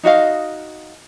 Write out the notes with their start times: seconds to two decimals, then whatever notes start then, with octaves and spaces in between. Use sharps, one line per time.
0.03 D#4 F#4 D#5 F5